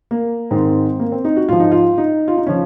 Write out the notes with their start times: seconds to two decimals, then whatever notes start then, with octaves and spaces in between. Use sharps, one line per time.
0.11 A#3
0.51 G#2 D#3 C4
1.00 A#3
1.12 C4
1.25 D#4
1.37 F#4
1.48 G#2 F3 F4
1.60 D#4
1.72 F4
1.98 D#4
2.28 F4
2.37 D#4
2.46 C#3 F3 C#4